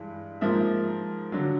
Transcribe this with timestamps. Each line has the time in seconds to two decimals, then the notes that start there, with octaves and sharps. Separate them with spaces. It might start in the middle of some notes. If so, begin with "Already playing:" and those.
Already playing: G2 E3 G#3
0.41 G#2 F3 A#3 E5
1.32 D3 F#3